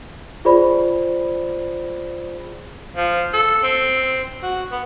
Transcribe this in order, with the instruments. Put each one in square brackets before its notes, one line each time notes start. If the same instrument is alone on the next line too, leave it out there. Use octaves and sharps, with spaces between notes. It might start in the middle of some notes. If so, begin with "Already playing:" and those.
[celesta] F4 G#4 C5 D5 B5
[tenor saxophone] F3
A4
C4
F#4
B3